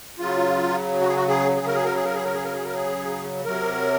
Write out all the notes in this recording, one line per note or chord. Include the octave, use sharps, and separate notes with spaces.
C#3 F#3 F4
F#4
G#4
F#4
G#4
G#4
A#4
G#4
A#4
G#4
A#4
G#4
A#4
G#4
A#4
G#4
A#4
G#4
C3 F#3 A#4